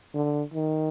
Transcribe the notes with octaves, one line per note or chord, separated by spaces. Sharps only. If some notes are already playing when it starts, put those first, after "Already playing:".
D3
D#3